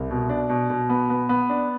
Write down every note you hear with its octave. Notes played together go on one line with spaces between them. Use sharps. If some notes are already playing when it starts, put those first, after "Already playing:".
Already playing: C2
B2
D4
B2
B2
B3
B3
B3
D4